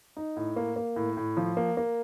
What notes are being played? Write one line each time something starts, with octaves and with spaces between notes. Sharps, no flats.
D#4
A2
A#3
A#3
A2
A2
F3
A#3
A#3